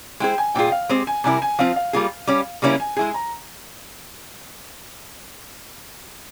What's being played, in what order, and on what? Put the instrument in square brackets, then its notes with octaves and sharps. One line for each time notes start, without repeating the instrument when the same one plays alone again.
[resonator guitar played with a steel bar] G#3 E4 G#4 C5 [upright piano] G5
[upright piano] G#5
[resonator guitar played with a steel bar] A#2 G3 C#4 F4 G#4 [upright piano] G5
[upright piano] F5
[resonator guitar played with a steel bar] G#3 C4 G4 C5
[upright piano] G#5
[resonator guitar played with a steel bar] C3 G3 C#4 E4 A#4 [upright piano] G#5
[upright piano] G#5
[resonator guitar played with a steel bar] F3 C4 F4 [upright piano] F5
[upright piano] F5
[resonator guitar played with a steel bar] G3 A#3 F4 G#4
G3 C#4 G4
C#3 G3 A#3 C#4 E4
[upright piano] G#5
[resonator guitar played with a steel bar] G#3 E4 G#4 [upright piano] G#5
[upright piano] A#5